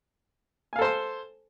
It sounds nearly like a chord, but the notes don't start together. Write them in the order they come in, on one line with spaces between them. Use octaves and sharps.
G#5 F5 A4 C5 C6